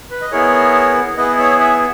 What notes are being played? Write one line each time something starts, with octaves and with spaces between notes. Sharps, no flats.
B4
D#5
B3 E4 G#4 A#4 C#5
B3 E4 G#4 B4 D#5
C#5 E5
E5 G#5